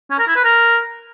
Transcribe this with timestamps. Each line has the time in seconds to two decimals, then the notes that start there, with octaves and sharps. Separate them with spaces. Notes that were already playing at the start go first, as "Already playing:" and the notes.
0.10 C#4
0.19 A#4
0.27 E4
0.36 B4
0.44 A#4